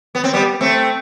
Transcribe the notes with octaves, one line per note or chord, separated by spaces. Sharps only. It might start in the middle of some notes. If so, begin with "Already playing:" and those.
B3
C4
G3 B3
A3 C4